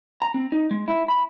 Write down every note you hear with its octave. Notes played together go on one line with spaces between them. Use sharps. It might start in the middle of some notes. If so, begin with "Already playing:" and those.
A#5
C4
D#4
G#3
E4
B5